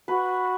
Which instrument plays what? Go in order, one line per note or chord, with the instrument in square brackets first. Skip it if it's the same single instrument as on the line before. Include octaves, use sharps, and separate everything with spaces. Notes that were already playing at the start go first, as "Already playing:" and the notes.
[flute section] F#4 [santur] B4